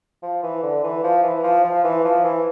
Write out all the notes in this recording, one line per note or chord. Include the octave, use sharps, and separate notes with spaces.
F3
E3
D3
E3
F3
E3
F3
F3
E3
F3
E3